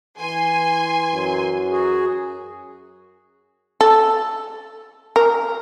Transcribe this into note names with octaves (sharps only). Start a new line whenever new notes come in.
E3 G#5 C6
F#2
F#4 G#4
A4
A#4